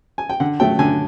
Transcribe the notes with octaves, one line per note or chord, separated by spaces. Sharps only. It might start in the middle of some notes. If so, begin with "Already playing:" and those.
G#5
G5
D3 F#5
F#3 A3 G5
D3 G#5